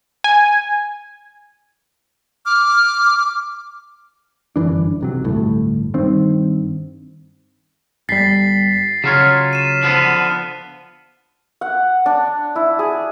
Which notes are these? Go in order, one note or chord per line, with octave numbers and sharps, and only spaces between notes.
G#5
D6 F6
G1 F#2 E3 D4
B1 C3 F#3
G1 D2 A2
G2 D#3 C4
G1 G3 A6 B6 C7
C#3 F#3 F4 C#5
D#7 E7
D3 F3 B3 F6 C7
F#5
D4
E4
G#4